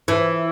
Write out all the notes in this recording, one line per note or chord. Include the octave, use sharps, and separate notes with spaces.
E3